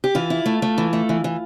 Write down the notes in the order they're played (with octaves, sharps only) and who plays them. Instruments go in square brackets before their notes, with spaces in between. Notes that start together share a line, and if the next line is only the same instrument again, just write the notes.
[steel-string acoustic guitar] G4
E3 F4
E4
A3
A3
E3
A3
E3
E3